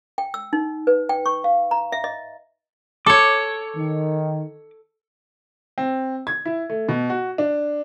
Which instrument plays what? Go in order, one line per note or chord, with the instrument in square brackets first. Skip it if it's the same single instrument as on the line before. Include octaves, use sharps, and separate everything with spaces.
[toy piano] G5
E6
D#4
B4
G5
C#6
F5
A#5
E5
D#5
[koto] A4 C#5 [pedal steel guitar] D6
[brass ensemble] D#3
[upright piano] C4
G#6
E4
A3
B2
F#4
D4